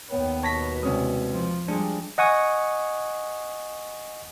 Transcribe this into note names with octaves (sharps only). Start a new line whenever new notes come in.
D#2 B3 C#5 G5
B2 C#5 A5 A#6 B6
C2 G#3 C4 C#4 D#6
F3
F3 G3 G#3 D4 G#4
D#5 F#5 G#5 C#6 D#6